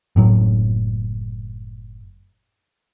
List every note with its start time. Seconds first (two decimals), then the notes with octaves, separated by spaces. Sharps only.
0.16 F#1 A2 F#3